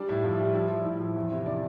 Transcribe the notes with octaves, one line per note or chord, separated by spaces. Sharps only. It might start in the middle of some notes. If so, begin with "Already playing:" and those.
Already playing: G3 D4 D5
A2 E4 E5
A2 F3 F4
G3
F3 E4
F3
A2 E4
F3
E2
C3 E4
E3 D4 D5